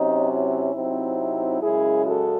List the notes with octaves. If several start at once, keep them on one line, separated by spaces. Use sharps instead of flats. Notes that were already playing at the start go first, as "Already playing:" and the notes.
Already playing: C3 F#3 C#4 D#4
E4
C3 F#3 C4 D#4
F#2 C#3 G#3 E4 G#4
F#4 A4